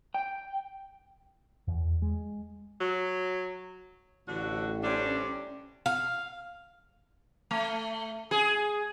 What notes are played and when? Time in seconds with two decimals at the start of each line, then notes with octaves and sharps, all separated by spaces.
0.14 G5
1.67 E2
2.02 G#3
2.80 F#3
4.28 A1 D3 F#4
4.83 C3 G3 C#4 D4 G4
5.86 F5
7.51 A3
8.31 G#4